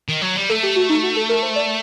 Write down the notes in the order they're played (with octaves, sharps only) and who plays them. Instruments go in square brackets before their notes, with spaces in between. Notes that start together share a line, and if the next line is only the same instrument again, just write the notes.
[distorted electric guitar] D#3
F#3
G3
[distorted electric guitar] A3 [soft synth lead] A4
[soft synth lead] G4
F#4
D#4
F#4
A4
A#4
C5
D5